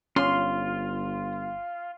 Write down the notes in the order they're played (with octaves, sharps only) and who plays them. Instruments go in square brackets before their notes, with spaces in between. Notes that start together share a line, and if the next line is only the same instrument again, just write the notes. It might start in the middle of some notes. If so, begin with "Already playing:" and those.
[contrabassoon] G1 [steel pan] C#4 [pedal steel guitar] F4 [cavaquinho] C6